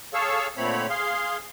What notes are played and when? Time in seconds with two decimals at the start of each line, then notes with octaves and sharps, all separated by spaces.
0.13 G#4 A4 C#5 F5 C#6 E6
0.57 A#2 D3 A3 C4 C#5 B5
0.89 G#4 F5 C6